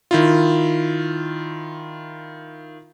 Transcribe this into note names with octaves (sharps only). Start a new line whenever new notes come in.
D#3 E4 F4